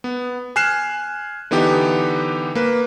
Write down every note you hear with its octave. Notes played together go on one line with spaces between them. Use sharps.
B3
G#5 F6 F#6 C7 E7
D3 E3 B3 D#4 G4
A#3 B4